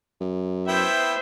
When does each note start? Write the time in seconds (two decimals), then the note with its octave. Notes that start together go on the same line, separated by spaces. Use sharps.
0.21 F#2
0.68 B3 E4 C5 E5 G5